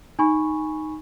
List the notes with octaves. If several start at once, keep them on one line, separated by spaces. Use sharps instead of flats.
D#4 G#5 B5 C#6